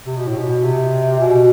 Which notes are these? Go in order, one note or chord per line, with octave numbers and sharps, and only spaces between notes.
C3
B2
A2
B2
C3
B2